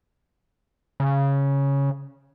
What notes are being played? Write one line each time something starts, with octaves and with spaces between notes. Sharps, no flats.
C#3